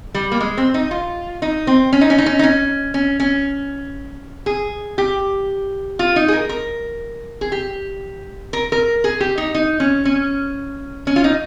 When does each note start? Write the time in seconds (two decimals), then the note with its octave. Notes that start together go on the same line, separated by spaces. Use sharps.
0.14 G3
0.32 A#3
0.40 G#3
0.57 C4
0.74 D#4
0.91 F4
1.42 D#4
1.67 C4
1.92 C#4
2.01 D#4
2.10 C#4
2.18 D#4
2.26 C#4
2.39 D#4
2.43 C#4
2.94 C#4
3.20 C#4
4.46 G#4
4.98 G4
5.99 F4
6.16 D#4
6.28 G#4
6.33 A#4
6.49 A#4
7.41 G#4
7.52 G4
8.53 A#4
8.72 A#4
9.04 G#4
9.20 G4
9.38 D#4
9.54 D#4
9.80 C#4
10.05 C#4
11.07 C#4
11.16 F4
11.24 D#4